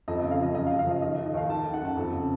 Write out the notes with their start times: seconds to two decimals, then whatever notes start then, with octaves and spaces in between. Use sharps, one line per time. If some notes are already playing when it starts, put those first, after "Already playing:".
0.08 F2 D#5
0.20 D#5
0.23 C#3
0.31 F5
0.39 F3 D#5
0.55 F#2 D#5
0.67 F5
0.71 C#3
0.79 F5
0.86 F3 D#5
1.02 D#3 D#5
1.14 D#5
1.18 D#3
1.26 D#5
1.34 D#2 F5
1.49 D#3 A5
1.62 A5
1.66 D#3
1.74 F#5
1.82 F#2 A5
1.97 F2
2.12 C#3